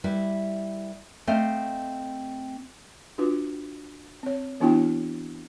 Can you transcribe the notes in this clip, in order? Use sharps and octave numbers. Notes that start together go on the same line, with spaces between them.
G3 E4 B4
A3 C4 D#5 F5
D4 F4 F#4 B4 D6
C4 C#5
E3 B3 D4 E4 F#4 G5